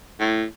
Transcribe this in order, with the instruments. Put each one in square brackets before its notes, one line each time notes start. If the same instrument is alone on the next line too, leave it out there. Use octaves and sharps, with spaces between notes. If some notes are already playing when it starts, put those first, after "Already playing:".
[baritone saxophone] A2